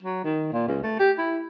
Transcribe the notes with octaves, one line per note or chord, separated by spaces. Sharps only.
F#3
D#3
A#2
C#2
A3
G4
E4